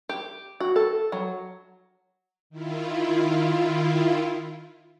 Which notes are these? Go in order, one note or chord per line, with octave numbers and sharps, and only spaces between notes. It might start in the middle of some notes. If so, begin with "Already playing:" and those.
G4
F#4
A4
F#3
D#3 E4 F4